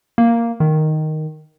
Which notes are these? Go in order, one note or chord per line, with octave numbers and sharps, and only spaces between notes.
A#3
D#3